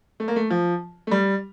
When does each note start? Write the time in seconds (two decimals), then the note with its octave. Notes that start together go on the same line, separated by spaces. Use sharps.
0.20 A3
0.28 A#3
0.36 A3
0.50 F3
1.07 A3
1.11 G3